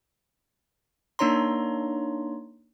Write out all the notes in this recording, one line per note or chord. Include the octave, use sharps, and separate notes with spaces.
A#3 D4 D#4 C#5 A#5 C6